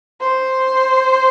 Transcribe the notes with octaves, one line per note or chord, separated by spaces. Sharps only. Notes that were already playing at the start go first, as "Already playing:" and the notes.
C5